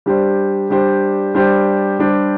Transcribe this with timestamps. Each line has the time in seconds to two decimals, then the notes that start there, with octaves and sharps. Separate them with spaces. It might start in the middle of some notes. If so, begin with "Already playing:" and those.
0.06 G3 D4 G4 C5
0.70 G3 D4 G4 C5
1.35 G3 D4 G4 C5
1.99 G3 D4 G4 C5